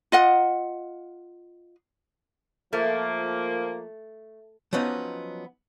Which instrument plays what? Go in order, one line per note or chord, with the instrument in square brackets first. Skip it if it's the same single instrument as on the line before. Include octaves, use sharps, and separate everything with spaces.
[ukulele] F4 D#5 F#5
[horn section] F3 A#3 [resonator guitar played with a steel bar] A3
[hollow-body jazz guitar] F3 F#3 B3 C#4 D#4